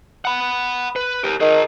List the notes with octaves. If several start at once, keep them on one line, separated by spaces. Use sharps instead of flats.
F#5 B5
B4
G4 A#4
D#3 G#4 A#4